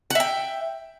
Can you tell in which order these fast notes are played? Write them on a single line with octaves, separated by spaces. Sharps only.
F#5 E5 G5